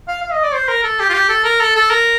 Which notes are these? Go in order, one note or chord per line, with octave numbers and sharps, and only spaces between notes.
F5
F5
D#5
D5
C5
A#4
A4
G4
F4
G4
A4
A#4
A4
A4
A#4